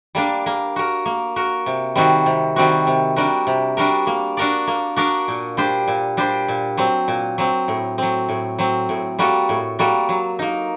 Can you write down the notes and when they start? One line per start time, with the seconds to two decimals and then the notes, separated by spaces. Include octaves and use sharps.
0.15 G3 A#3 D4
0.46 A#3
0.76 F#4 A#4
1.06 A#3
1.36 F#4 A#4
1.66 C3
1.96 D#3 G3 C4 F#4
2.26 C3
2.56 D#3 G3 C4 F#4
2.87 C3
3.16 G3 D4 F#4 A#4
3.47 C3
3.77 G3 D4 F#4 A#4
4.07 A#3
4.37 D4 F#4 A#4 D5
4.67 A#3
4.96 D4 F#4 A#4 D5
5.28 A#2
5.57 G3 D4 G4 C5
5.88 A#2
6.17 G3 D4 G4 C5
6.48 A#2
6.77 F#3 C4
7.08 A#2
7.38 F#3 C4
7.68 A2
7.98 F#3 C4
8.29 A2
8.59 F#3 C4
8.89 A2
9.19 G3 A#3 F#4 A4
9.49 A2
9.79 G3 A#3 F#4 A4
10.09 F#3
10.39 A#3 D#4